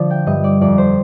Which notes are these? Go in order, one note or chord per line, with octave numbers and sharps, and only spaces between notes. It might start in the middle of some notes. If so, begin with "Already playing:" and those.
Already playing: D3 F3 C5 D5
G5
G2 D#5
D5
F2 D5
C5